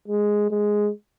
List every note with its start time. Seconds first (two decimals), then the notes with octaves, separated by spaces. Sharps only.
0.08 G#3
0.51 G#3